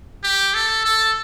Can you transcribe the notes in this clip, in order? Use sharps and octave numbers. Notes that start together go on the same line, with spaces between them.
G4
A4
A4